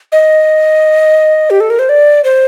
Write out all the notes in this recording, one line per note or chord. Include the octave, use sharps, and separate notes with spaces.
D#5
G4
A4
A#4
C5
D5
C5